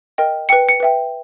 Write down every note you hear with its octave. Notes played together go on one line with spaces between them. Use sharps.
A#4 D#5 G5
B4 G5 C#7
C#7
B4 E5 G5